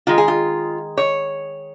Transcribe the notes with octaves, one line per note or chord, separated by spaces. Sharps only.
D#3 G#3 F4
G#4
F4
C#5